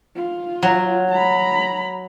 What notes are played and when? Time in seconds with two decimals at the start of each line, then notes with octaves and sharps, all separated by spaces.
0.16 F4
0.62 F#3
1.11 A#5 B5